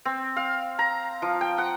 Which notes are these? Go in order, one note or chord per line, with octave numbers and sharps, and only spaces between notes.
C4
F5
A#5
F3
G5
F#5